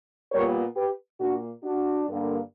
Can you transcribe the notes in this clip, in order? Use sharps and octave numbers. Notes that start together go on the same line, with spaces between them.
A#2 G3 B3 A#4 C#5
G4 B4
A#2 A#3 D4 F#4
D4 F#4
G2 D3 A#3